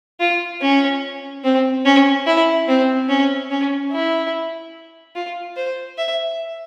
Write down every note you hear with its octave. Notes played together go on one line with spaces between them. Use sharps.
F4
C#4
C4
C#4
E4
C4
C#4
C#4
E4
F4
C5
E5